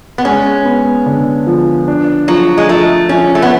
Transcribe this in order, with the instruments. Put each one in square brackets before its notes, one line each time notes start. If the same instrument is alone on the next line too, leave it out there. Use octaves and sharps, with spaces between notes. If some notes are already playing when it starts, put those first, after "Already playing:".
[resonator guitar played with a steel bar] B3
[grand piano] G#3 [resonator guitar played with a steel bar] C#4
[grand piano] B3
D3
F3
D4
[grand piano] F3 [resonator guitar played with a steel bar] F#3
[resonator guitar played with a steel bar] G#3
[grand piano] F3 [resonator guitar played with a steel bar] A3
[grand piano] F3 [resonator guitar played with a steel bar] C#4
[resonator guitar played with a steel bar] A3
B3